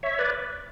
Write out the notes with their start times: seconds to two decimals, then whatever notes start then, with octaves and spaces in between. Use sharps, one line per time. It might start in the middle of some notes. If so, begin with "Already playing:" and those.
0.03 C#5 E5
0.18 B4 D5